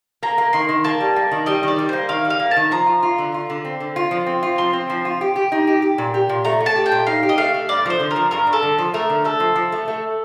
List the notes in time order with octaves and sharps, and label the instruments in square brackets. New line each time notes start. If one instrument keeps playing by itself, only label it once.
[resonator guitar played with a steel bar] A#3 [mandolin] A#5
[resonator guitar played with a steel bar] A#3
[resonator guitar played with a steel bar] D#3 [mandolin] C6
[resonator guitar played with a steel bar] D#3
[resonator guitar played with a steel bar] A#3 [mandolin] A5
[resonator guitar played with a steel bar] G3
A#3
D#3
[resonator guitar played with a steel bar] G3 [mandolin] D#5
[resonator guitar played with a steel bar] D#3 [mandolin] D5
[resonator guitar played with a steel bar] G3
[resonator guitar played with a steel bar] A#3 [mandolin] C5
[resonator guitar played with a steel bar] D#3 [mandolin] F5
[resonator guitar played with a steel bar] G3
[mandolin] F5
[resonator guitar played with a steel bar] A#3
[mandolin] A5
[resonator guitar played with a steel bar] D#3
[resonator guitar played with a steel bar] F3 [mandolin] A#5
[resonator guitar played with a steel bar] F4
F4
D3
F4
D3
C4
D3
F4
F3
C4
F4
[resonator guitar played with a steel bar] F3 [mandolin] C6
[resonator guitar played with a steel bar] C4
F3
F4
G4
G4
D#4
G4
G4
A#2
G4
A#2
[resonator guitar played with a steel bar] A3 [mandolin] A#5
[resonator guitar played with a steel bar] A3
[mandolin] A5
[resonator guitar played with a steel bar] G4
[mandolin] G5
[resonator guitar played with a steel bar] A#2
[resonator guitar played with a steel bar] D#4 [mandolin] F5
[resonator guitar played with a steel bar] G4
[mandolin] D#5
[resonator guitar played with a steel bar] A3 [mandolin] F5
[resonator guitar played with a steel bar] A3
[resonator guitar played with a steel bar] G2 [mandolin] D5
[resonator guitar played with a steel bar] F3 [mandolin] A#4
[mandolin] C5
[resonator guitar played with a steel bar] D3
[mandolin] A#4
[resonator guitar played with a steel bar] F3
[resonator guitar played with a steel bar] G2 [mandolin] A#4
[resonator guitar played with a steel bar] G2
[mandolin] A4
[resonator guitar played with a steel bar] D3
F3
[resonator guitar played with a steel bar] A3 [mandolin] A#4
[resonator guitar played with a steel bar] D3
[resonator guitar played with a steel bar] A3 [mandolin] A4
[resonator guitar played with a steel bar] F3
F3
A3
A3